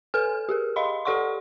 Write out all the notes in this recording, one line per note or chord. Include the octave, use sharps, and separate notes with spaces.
A4 B4 G#5 F6
G4 G#4 A#4
D#5 F5 B5 C6
G4 A4 D5 F#5 C6 C#6